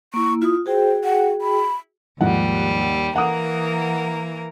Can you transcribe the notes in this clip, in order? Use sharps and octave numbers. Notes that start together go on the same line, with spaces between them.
A#3 E4 C#6
E4 F4 D#6
F#4 G#4 C5 G5
F#5
B5
D#2 G#2 F3 G3 F#5
E3 A#3 A#4 F#5 D#6